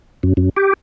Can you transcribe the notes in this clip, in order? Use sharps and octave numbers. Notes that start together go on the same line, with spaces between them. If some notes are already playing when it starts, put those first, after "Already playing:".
F#2
F#2
G4